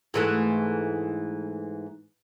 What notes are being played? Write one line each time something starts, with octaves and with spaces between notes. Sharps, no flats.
G#2 E3 A3